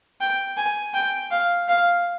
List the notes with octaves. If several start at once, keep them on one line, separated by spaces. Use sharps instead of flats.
G5
G#5
G5
F5
F5